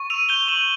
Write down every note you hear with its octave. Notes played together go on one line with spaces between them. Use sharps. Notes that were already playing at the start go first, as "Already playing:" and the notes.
Already playing: C#6
E6 D#7 F7
G6 F7 G7
C#6 E7 F#7